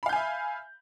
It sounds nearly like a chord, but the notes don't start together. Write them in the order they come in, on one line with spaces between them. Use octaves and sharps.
B5 F5 G6 G#5 E5